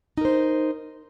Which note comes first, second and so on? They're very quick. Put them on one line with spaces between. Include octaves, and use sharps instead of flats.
D#4 A#4 C5